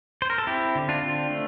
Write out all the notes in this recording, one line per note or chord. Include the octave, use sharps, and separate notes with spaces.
C5
A#4
A4
C4 E4 G4
D3
D4 F4
C4
A3